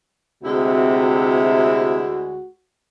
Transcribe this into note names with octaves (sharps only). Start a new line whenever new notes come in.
D2 C3 G#3 E4 F#4